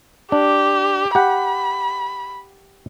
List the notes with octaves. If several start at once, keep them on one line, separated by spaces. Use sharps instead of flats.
D4 G4
G4 F#5 B5